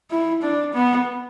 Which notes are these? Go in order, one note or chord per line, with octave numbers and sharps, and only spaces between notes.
E4
D4
B3